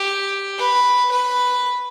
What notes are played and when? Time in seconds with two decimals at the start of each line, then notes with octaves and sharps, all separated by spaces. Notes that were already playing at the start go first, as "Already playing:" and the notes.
Already playing: G4
0.58 B4
1.11 B4